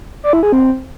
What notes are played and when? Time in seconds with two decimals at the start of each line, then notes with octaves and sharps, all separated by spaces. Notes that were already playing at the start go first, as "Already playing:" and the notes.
0.24 D5
0.33 E4
0.43 G#4
0.52 C4